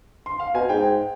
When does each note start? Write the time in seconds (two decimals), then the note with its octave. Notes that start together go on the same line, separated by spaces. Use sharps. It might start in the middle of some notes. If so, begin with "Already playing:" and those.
0.26 C6
0.40 F5
0.55 B2 G#5
0.69 G#2 G5